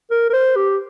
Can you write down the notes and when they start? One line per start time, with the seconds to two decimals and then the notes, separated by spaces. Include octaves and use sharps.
0.11 A#4
0.29 A#4
0.33 C5
0.56 G4